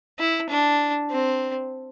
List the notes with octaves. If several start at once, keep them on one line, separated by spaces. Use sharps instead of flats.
E4
D4
C4